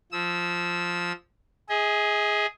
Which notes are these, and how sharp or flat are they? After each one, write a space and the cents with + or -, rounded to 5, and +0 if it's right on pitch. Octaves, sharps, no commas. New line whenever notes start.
F3 +0 E6 -20
G#4 +0 D#5 +40